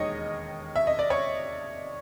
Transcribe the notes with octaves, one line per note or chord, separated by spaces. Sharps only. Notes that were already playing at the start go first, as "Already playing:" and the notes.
Already playing: E1 D#2 D#3 G#3 C#5 D#5
E5
D#5
D5
C#5